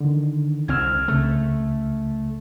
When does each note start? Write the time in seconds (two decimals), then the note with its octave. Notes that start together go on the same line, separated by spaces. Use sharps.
0.01 D3 D#3
0.68 C2 C4 E6 F6 G#6
1.08 C#2 C#3 A3